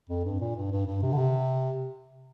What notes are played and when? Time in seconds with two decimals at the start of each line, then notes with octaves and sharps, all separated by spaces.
0.09 F2
0.25 G2
0.40 A#2
0.56 G2
0.71 G2
0.87 G2
1.03 C3
1.13 D3
1.18 C3